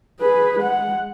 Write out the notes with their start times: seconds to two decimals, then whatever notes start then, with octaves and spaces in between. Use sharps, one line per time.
0.20 G#4 B4
0.60 G#3 F#5